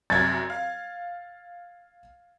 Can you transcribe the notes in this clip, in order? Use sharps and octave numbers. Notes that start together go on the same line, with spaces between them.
C2 F#2 G#6 A6
F5